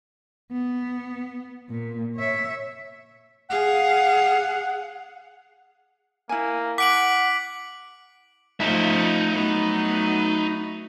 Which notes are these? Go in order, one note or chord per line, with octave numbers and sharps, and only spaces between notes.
B3
A#2
C#5 E5
G#4 F5 F#5
A#3 E4 G#5
F#5 D6 B6 D7 F#7
F3 A3 D#4 E5
F#3 A3 B3